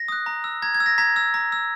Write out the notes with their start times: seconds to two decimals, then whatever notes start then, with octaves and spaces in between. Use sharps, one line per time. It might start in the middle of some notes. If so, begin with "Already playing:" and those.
Already playing: A#6
0.08 D#6 F#6
0.26 A#5
0.44 E6
0.62 A#5 G#6
0.74 G#6
0.80 E6
0.86 A#6
0.98 A#5 G#6 B6
1.16 E6
1.34 A#5
1.52 E6